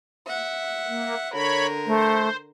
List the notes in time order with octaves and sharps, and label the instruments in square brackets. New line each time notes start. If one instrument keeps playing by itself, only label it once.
[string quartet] E5 F#5
[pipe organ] A#3
[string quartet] D3 A#4 [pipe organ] C#5 B5
[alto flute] A3 [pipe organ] C5